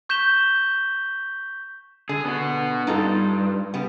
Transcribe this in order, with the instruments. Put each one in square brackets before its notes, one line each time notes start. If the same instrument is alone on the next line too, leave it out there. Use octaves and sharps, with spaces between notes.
[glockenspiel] C#6 G6 B6 E7 G7
[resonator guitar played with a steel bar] D3 [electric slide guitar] G#4
[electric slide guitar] B3 F#4
[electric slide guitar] G2 [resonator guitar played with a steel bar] D#4 F4 A4
[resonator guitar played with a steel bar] C#3 G3 B3